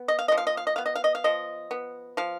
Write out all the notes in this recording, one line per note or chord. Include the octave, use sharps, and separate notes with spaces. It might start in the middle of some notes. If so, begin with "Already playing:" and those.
Already playing: B3
D#5
F5
F3 D#5
F5
D#5
F5
D#5
B3 F5
D#5
F5
D#5
F5
F3 D#5
B3
F3 F5